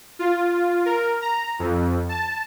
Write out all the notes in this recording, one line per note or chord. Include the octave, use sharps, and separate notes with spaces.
F4
A#4
A#5
F2
A5